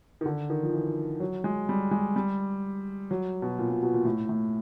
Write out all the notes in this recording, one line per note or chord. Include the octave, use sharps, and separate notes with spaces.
D#3
D3
D#3
F3
E3
F#3
G#3
G3
G#3
G3
F#3
B2
A#2
A#2
B2
A#2
A2
A2